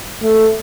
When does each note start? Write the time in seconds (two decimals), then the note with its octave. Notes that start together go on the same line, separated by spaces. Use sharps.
0.23 A3